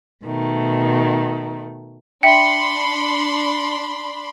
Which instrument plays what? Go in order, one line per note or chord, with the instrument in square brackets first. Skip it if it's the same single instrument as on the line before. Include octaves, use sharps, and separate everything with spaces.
[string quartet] B2 D#3 A3
[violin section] D4 B5 C6 [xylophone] E5 G5 [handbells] C#7